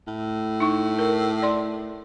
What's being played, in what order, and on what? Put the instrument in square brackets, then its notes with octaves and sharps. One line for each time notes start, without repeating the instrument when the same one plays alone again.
[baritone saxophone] A2
[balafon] D#4 C#6
A#4
D5 C6